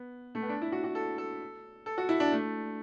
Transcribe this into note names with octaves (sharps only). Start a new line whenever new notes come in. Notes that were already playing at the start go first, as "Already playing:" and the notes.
Already playing: B3
A3
B3
D4
E4
F#4
F#4
A4
A4
A4
F#4
E4
D4
A3